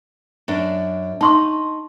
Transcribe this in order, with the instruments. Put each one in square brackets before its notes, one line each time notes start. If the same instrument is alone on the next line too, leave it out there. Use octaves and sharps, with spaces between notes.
[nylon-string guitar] F#2 D4
[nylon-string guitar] D#4 [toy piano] A5 C6 C#6